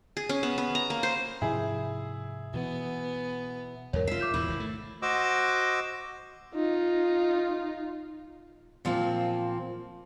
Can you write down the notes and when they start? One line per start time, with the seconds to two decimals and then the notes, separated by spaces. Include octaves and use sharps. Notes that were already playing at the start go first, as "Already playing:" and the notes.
0.17 G#4
0.29 C#4
0.43 B3
0.58 B3
0.75 A#5
0.90 A#3
1.03 C5
1.42 G#2 C3 F3 E4 G#4
2.54 B2 E3 B3
3.93 E2 G#2 F#3 A#4 C#5
4.07 C#3 F4 E5 C7
4.20 G#2 D6 G6 C7
4.34 E2 B2 E3 E4
4.48 G#1 B2
4.60 A3
5.02 F#4 C5 D#5 D6 E6
6.55 D#4 F4
8.85 A#2 F3 A#3 C4